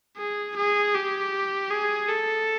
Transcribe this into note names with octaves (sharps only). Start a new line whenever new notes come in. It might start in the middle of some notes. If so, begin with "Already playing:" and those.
G#4
G#4
G4
G#4
A4